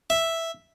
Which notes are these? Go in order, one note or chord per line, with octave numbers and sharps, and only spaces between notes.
E5